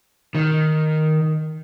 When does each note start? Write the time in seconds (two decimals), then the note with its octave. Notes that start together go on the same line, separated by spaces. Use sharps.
0.35 D#3